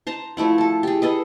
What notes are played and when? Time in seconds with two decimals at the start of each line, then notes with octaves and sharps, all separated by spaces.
0.07 C5 A5 A#5
0.37 F3 A3 E4 F#5
0.58 A4 A5
0.83 G4 G#4
1.02 G#4 A4 B4 D#5